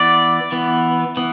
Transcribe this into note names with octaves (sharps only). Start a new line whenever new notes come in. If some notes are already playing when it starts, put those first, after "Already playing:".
Already playing: E3 B3 D5
E3 B3
E3 B3